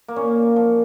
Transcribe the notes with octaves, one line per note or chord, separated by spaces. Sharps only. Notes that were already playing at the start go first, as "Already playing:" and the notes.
A#3
A#2 C#4
F3